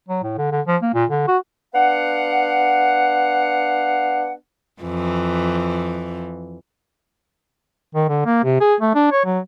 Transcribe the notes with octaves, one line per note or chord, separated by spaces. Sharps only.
F#3
A2
D3
D3
F3
A#3
A#2
D3
F#4
B3 D4 F5 F#5
F2 E3
D#3
D3
A#3
C3
G#4
A3
D4
C#5
F#3